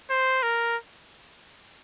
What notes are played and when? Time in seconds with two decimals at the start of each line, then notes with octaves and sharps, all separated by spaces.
0.10 C5
0.43 A#4